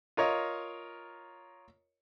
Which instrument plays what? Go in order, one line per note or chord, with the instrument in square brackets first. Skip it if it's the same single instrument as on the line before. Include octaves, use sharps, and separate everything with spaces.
[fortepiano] F4 A#4 C#5 D#5